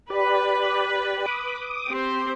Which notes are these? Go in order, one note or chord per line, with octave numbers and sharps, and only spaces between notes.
G4 B4 D5
D6 D#6
C4 G4 C5